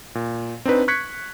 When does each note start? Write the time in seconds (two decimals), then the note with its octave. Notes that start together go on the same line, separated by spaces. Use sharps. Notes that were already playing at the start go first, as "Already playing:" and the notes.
0.15 A#2
0.65 C4 D4 D#4 B4
0.88 C#6 F#6 G#6 B6 C#7